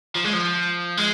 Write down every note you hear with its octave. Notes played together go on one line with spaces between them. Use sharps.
F3
G#3
F3
G#3